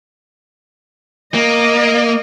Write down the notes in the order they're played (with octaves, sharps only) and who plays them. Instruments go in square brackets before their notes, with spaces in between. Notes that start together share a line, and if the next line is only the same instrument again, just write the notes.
[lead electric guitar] A#3 [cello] D#5